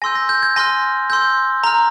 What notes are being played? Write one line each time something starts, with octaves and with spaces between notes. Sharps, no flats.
G#5 C6 E6 G6 A#6
A#6
G6
G#6
G#5 C6 F6 A#6
C6 E6 G6
A#5 F6